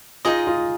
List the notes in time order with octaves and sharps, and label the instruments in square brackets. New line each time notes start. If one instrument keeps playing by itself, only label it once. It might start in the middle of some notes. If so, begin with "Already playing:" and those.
[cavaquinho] D#4 G#4 D#5 [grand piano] F4
[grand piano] F4